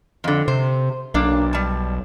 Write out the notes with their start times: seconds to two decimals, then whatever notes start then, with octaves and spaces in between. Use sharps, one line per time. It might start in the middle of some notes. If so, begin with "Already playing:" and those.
0.24 F2 D3
0.48 C3 C5
1.14 B1 A#3 D4
1.53 G3 A5